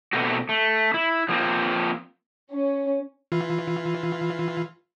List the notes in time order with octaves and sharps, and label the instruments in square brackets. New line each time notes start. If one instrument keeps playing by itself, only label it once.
[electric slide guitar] B2 A3 A#3 C4 F#4
A3
E4
F3 A#3 C4
[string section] C#4
[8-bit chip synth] E3 F4